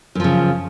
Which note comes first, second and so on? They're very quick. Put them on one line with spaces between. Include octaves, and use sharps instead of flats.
F#2 F3 C#3